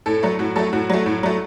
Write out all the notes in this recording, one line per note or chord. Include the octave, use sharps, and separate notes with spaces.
A2 A4
F#3 A3
A2 F#4
F#3 A3 A4
A2 F#4
F#3 A3
A2
F#3 A3